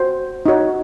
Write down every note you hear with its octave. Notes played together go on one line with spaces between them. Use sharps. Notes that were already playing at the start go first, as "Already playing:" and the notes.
Already playing: F#4 C5
D#4 F#4 C#5